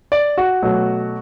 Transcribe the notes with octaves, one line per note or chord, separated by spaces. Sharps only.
D5
F#4
B2 F#3 A3